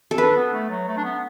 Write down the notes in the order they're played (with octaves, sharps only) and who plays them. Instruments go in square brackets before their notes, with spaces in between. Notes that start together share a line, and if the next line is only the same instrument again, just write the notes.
[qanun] A4
[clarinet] D4 [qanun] B4
[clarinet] B3
A3
F#3
A3
D4
B3